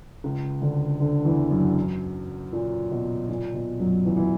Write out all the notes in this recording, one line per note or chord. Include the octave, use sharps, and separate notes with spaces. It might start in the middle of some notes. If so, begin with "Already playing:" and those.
C#2 C#3
D2 D3
D2 D3
E2 E3
F#2 F#3
A#2
B2
A#2
B2
F#2 F#3
E2 E3
E3